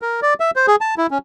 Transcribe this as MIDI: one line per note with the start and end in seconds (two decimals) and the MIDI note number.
0.02 0.20 70
0.22 0.34 74
0.40 0.51 76
0.56 0.66 72
0.67 0.76 68
0.81 0.95 81
0.98 1.07 64
1.11 1.18 61